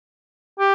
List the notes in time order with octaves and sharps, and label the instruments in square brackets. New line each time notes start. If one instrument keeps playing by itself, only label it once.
[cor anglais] G4